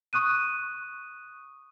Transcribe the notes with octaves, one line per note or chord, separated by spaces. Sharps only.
C#6 D#6 F#6 D#7